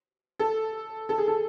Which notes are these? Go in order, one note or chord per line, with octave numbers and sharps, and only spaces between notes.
A4
A4
G#4
A4